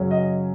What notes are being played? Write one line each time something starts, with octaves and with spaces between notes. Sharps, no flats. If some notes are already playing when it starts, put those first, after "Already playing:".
Already playing: F#2 C#3 F#3 C#4
D#5